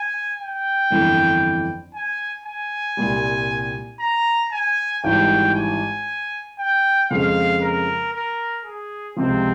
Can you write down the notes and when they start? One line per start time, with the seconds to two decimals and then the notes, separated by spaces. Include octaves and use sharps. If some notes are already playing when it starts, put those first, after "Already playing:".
Already playing: G#5
0.39 G5
0.90 G1 F2 E3
1.94 G#5
2.46 G#5
2.97 C2 A#2 G3
4.00 A#5
4.52 G#5
5.04 G#1 G#2 E3 G3 G5
5.55 G#5
6.59 G5
7.10 F2 C#3 F3 G#3 F5
7.62 A#4
8.13 A#4
8.65 G#4
9.16 C#2 C3 F3 C4